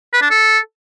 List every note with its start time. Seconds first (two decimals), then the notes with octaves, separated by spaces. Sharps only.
0.13 B4
0.22 D4
0.30 A4